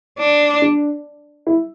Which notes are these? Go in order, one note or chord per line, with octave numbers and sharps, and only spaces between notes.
D4
D4
E4